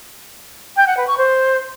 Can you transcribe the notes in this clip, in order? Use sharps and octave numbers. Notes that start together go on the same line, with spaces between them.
G5
F#5
B4
C#6
C5